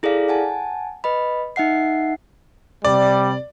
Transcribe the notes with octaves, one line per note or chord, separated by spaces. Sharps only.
E4 G#4 A4 D5 F5
F#5 G#5 A5
B4 D#5 B5
D#4 E5 F#5 C7
C3 G3 D5